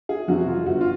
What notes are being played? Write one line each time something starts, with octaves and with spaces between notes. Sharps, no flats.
G#4
F2 C3 E3 F#4
F4
G1 F#4
F4